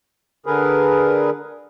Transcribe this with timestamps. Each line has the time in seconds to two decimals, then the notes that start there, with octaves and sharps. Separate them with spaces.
0.46 D3 G#4 A#4 B4